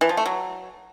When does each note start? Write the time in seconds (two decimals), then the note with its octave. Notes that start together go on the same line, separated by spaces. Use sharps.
0.01 E3
0.09 F3
0.17 A3
0.26 F#3